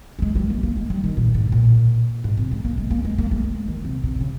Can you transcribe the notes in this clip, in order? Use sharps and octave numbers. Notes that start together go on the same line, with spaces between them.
A#3
G#3
G3
A#3
A#3
G#3
G3
D#3
A#2
G#2
A#2
G#2
C3
G#3
A#3
G#3
A#3
G#3
A#3
G#3
D#3
C3
C3
C#3